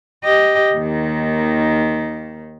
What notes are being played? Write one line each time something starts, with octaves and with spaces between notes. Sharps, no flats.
G4 D#5
D#2 D#3